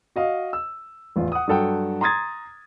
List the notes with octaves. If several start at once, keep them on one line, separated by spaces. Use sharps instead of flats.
F#4 D#5 F5
E6
A1 E2 F4
F#5 D#6
G2 F#3 A4 F#5 G5
A#5 C6 D#6 G#6 A6